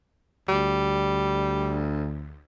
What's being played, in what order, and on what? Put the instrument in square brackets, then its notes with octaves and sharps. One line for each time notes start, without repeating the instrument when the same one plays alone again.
[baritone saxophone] D2 [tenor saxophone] G3